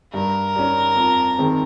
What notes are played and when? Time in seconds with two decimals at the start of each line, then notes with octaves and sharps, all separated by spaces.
0.13 G2 A#4
0.55 G3 C#4
0.96 F2
1.39 D#3 G#3 C4